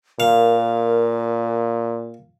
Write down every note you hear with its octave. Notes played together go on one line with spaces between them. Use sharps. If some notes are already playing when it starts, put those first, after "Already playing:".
A#2 A#4 F5